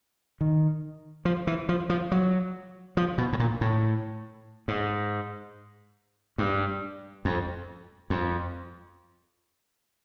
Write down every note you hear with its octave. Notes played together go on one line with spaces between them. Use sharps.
D#3
F3
E3
F3
F3
F#3
F3
B2
A2
A#2
A2
G#2
G2
F2
F2